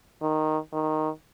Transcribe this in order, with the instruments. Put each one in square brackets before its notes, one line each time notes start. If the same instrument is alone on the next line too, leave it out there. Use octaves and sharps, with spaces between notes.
[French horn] D#3
D#3